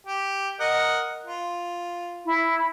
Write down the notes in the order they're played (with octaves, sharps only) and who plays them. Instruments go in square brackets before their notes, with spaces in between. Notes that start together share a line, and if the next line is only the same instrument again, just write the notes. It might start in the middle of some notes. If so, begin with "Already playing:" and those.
[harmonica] G4
A#4 D#5 F#5
F4
[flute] E4